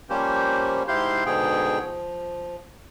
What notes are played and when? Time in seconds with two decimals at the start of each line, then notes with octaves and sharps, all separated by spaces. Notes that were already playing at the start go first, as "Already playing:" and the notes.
0.10 F3 G3 A#3 C#4 G4 C5
0.88 G#2 E4 G4 F5 C6 G6
1.26 G#2 B2 D3 G#4 G5
1.81 F3